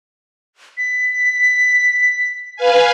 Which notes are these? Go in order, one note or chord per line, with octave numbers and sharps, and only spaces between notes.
B6
B4 F5 G#5